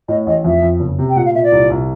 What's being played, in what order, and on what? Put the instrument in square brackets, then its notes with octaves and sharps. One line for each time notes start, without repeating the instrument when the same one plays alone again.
[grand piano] A2 [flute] D#5
[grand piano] A1 [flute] D#5
[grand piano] F2 [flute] E5
[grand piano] F2
F#1
C3
[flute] G5
[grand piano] A#2 [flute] F#5
[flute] F5
[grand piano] A#2 [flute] E5
[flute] D5
[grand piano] C2
C2